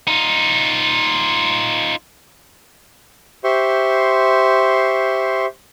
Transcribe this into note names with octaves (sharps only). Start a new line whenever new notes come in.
D#4 F4
G4 C5 E5 C6 C#6